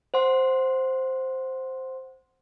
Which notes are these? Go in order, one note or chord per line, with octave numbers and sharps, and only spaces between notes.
C5 F#5 C6